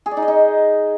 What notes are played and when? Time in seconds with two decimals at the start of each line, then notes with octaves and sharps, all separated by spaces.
0.06 G#4
0.11 D5
0.17 D#4
0.22 D#5
0.28 D#4